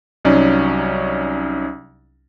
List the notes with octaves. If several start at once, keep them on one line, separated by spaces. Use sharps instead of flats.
C2 F#3 C#4 D#4 D5